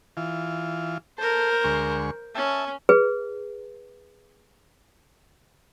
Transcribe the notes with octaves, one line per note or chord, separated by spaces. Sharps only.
E3 F4
A4 A#4 C5
D2 G#3 C#6
C#4 E5 A5
G#4 B4